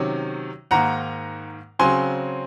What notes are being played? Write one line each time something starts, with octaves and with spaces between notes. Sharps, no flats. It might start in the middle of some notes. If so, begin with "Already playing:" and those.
Already playing: C3 D#3 F#3 C#4
G#2 D#3 A#3 F#5 A#5
C#3 F#3 C4 G#5 C6